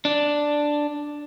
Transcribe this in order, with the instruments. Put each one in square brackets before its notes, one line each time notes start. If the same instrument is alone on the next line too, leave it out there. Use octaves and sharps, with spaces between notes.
[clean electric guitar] D4